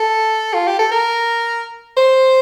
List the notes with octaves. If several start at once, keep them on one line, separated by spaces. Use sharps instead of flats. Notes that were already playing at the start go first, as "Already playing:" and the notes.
Already playing: A4
F4
G4
A4
A#4
C5